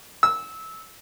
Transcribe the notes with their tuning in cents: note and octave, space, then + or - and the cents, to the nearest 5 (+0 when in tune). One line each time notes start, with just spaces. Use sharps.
E6 -20